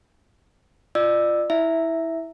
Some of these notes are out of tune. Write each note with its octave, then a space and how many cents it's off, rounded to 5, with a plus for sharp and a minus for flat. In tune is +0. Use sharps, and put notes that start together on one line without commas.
F4 -15 D5 +35 E6 +0
E4 -15 E5 +0